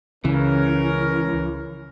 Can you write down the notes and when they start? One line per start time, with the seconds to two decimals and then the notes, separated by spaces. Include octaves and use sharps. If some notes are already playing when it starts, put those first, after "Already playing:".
0.25 C#2 C#3 E3 C#4 A#4